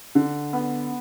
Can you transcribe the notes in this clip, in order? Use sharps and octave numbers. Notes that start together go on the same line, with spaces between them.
D3
B3